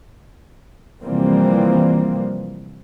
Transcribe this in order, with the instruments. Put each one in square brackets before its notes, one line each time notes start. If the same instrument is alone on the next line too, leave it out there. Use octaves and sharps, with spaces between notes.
[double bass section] C3 E3 F3 G3 A#3 C4